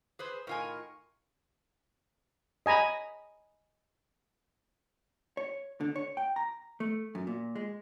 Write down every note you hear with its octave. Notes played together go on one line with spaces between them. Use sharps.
G#4 B4 C5
A2 D#3 F4 A#4 G#5 C#6
D#5 G#5 A#5 B5
C#5
D3
C#5
G5
A#5
A3
F#2
A#2
G#3